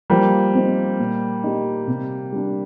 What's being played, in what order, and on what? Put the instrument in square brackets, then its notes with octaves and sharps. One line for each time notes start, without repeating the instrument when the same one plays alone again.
[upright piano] F3 [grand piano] G3 A#3
[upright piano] C4 D#4
A#2
G3 A#3 D#4
C3
G3 D4